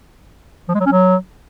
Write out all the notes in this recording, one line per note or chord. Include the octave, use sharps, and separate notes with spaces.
F3
G#3
F#3
C#4
F#3